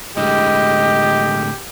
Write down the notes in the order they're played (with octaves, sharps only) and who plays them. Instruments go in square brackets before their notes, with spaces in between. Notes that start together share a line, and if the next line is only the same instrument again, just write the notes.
[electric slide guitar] A2 D3 G#3 [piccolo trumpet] G4 [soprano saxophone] D#5